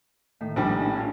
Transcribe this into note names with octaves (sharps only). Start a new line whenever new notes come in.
A2 D#3
A#1 G3 D#4
C#4 D4 E4
F4 C#5